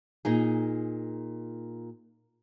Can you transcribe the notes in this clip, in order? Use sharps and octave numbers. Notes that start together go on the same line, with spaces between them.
A#2 D#4 G#4